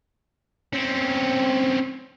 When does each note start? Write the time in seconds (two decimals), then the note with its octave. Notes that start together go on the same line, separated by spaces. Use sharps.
0.73 C4 C#4